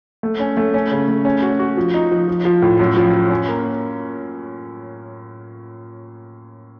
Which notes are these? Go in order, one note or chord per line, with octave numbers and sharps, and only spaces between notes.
A3
C#4
A3
C#4
C#3
A3
C#4
F#4
F#4
F3
D#4
F3
F3
F3
A2
F#2
F3
F3
C#4
A#3